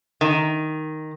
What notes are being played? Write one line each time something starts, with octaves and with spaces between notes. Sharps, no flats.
D#3